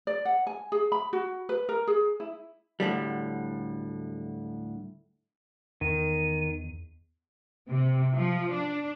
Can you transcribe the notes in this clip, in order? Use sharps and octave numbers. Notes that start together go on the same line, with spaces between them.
D5
F#5
G#5
G#4
B5
F#4
B4
A#4
G#4
E4
D2 A2 D3 G3
E2 D#3 D#7
C3
F3
D4